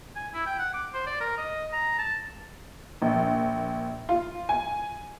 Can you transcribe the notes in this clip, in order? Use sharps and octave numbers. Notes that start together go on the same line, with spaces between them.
G#5
E4
G5
F#5
D6
C5
D5
A#4
D#5
A#5
A5
A#1
F4
G#5